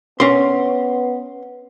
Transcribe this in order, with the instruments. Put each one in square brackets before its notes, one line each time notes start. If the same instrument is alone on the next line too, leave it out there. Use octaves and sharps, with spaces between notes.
[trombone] B3 [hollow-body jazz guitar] C#4 C6